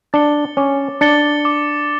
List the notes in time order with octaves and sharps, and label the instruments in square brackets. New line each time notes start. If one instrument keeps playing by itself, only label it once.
[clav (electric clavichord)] D4 [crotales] A6 C#7 G7
[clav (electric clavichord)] C#4 [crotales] D6
[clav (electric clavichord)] D4 [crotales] A6 C#7 G7
[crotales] D6